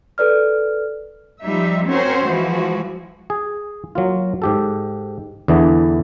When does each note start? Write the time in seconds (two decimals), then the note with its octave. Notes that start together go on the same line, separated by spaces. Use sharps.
0.18 A4 B4 D5 F6
1.43 F3 G3 D#4 E5
1.88 C4 C#4 F#4 A#4 C5
2.27 E3 F3 G#3 F#4
3.30 G#4
3.95 F#3 A#3 F4
4.42 G#2 G4 A4
5.48 E2 D3 E3 B3 D4